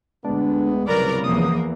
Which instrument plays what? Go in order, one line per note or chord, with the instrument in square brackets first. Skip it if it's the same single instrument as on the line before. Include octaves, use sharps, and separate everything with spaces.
[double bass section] D2 [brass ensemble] G#3 B3 [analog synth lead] D4
[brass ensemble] C2 G#2 C#3 [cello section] F#3 A#4 D5 [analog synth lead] B4
[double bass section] E2 E3 [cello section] F3 A#3 [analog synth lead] D#6